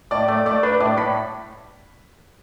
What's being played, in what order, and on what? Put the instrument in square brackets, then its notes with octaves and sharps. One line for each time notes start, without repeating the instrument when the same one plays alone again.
[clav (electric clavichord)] A2 [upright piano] D5 D6
[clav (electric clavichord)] A3 [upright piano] D5 D6
[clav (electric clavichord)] A3 [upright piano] D5 D6
[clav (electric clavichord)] D4 [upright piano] B4 B5
[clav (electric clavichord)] A2 [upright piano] D5 D6
[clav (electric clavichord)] A2 [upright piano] B5 B6